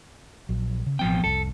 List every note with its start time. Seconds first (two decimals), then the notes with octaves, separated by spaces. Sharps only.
0.49 A#1 F#3
0.86 C#3
0.99 A1 B2 F3 C4 G5
1.24 F1 C2 A4